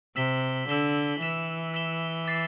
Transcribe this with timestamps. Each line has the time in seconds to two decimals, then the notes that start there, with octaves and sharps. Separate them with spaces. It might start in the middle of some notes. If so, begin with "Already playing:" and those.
0.16 C3 E6 B6 E7 G7
0.69 D3 E6 B6 E7 G7
1.21 E3 E6 B6 E7 G7
1.74 E6 B6 E7 G7
2.26 D6 A6 C7